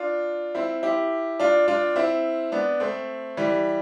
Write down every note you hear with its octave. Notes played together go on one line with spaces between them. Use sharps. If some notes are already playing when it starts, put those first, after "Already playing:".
Already playing: D4 F4
C4 E4
E4 G4
D4 F4
D4 F4
C4 E4
B3 D4
A3 C4
E3 G3